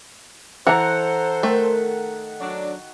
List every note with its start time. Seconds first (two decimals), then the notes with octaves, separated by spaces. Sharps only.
0.67 E3 A4 C5 F#5 A#5
1.43 D#3 A3
2.41 F#3 D4 F#4